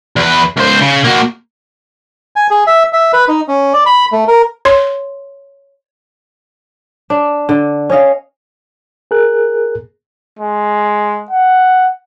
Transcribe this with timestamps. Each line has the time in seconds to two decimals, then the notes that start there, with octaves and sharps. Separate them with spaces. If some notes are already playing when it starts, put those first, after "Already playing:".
0.16 E2 B4
0.57 C#2 C5
0.82 C#3
1.04 A#3 F#4
2.36 G#5
2.51 G#4
2.67 E5
2.93 E5
3.13 B4
3.28 D#4
3.48 C#4
3.73 D5
3.86 B5
4.12 A3
4.28 A#4
4.65 C#5 C6
7.10 D4
7.49 D3
7.90 C#4 C#5 D#5 F5
9.11 G#4 A#4 F#6
10.39 G#3
11.31 F#5